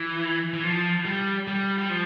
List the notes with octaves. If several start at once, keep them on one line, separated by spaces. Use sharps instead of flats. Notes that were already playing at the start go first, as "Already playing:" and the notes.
Already playing: E3
E3
F3
G3
G3
G3
F3